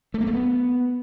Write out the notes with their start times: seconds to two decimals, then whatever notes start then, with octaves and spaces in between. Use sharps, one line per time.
0.14 A3
0.21 A#3
0.27 A3
0.33 B3